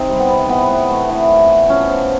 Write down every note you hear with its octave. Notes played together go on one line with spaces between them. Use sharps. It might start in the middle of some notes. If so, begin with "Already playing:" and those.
Already playing: C3 C4 D#4
G3
B3
C3
E3 B3
A2
A3
E3
A2
A2
F3 C#4
F3